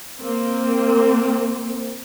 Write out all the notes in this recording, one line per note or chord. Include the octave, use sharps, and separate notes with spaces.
A#3 C4